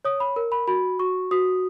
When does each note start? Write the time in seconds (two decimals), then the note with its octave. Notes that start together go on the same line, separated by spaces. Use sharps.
0.05 C#5 D#6
0.20 B5
0.36 A#4
0.52 B5
0.67 F#4 B5
0.99 F#4 C#6
1.31 F#4 D#6